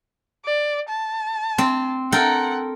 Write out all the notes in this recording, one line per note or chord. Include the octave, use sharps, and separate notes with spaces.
D5
A5
C4
A4 A#4 F#5 G5